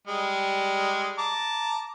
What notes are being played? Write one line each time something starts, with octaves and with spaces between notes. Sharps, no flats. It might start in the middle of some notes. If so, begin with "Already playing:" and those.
G3 G#3
A5 A#5 D6